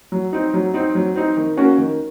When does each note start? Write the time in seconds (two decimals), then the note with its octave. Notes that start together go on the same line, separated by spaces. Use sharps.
0.12 F#3
0.33 C4 D#4
0.54 F#3
0.74 C4 D#4
0.95 F#3
1.15 C4 D#4
1.37 D#3
1.57 A#3 C#4 F#4
1.78 D#3